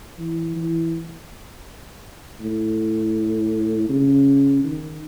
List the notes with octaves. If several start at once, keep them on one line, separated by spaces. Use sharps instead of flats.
E3
E3
A2
C#3
D#3